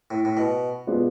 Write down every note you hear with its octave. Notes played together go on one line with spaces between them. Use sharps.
A2
A2
B2
B2 G#3 B3 D4 F4